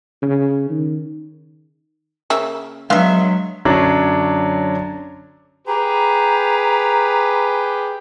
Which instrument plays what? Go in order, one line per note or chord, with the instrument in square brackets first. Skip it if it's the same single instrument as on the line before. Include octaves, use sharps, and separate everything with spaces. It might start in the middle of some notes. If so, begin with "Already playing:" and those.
[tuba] C#3
D#3
[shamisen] C#3 A#3 E5
[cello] F#3 [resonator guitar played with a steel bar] G#3 E5 [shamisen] B3 D4 F5
[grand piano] F#2 D3 F#3 C#4 D4
[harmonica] G4 G#4 B4 [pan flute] A#5